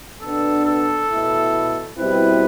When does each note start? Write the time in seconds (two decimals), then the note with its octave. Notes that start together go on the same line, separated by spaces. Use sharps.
0.22 B2 B3 D4 A4
0.66 A4
1.09 B2 A3 E4
1.97 B2 G3 C4 E4 B4